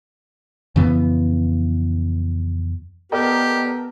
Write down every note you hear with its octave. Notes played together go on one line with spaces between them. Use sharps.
F2 C#3 E3 B3
B3 G4 A4 A#4 D5 D#5 G5